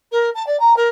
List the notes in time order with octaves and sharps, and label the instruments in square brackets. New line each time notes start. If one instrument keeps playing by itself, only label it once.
[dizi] A#4
A5
D5
A#5
A#4